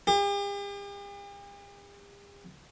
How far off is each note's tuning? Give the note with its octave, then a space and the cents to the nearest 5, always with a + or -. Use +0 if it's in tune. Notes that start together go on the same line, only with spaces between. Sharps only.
G4 +45